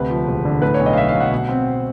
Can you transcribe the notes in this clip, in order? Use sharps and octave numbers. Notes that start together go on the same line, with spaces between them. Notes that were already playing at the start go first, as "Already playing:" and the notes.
Already playing: D2 C3 B4
F3
E1
D3
A2 B4
C#5
B1
D#5
F5
B1 E5
F5
F#3
F#5
B2
C4